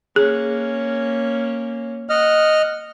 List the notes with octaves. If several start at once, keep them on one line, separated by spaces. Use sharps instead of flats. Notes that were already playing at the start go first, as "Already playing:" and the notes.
A#3 C#4 G#4
D#5 F#5 F6